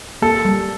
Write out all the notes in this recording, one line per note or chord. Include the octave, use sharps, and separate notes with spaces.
A#3 A4
G3